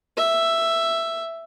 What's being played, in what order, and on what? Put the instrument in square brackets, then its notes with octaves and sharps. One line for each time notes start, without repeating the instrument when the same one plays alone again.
[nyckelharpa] E5